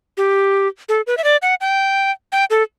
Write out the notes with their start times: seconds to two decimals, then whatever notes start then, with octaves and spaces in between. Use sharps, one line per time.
0.17 G4
0.89 A4
1.07 B4
1.18 E5
1.24 D5
1.42 F#5
1.61 G5
2.32 G5
2.50 A4